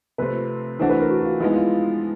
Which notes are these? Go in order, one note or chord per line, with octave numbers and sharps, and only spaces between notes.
C3 F3 A3 C4 B4
E3 A3 D4 F#4 C5
B4
A#4
F#4
F#4
F4
F3 G#3 B3 D#4 E4
F4